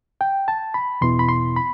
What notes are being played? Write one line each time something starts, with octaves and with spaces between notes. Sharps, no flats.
G5
A5
B5
E2 B2 B3 E4 C6
B5
C6
B5